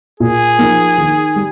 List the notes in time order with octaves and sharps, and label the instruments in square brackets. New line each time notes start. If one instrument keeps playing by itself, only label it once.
[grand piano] A#2 [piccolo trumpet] G#4
[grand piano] F3 A#3 D#4
D#3
G3